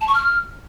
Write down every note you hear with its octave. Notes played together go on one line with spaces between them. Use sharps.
A5
C#6
F6